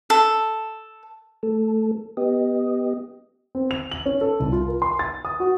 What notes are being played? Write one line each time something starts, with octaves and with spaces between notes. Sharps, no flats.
A4
A3 A4
B3 G4 D#5
C4
F7
F#7
C#4
A4
C2
F4
A#4
C6
A6
D#6
F#4